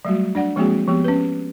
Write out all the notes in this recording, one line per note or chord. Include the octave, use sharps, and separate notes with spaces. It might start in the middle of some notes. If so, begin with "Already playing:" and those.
F#3 G3 A3 F#4
D4 D5 F#5
F3 G#3 A#3 C4 F#4 G#4
F3 B3 G4
C#4 B4